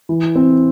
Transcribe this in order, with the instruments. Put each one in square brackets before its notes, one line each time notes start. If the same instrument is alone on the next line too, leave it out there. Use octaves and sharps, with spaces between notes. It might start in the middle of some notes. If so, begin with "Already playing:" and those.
[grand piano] E3
C4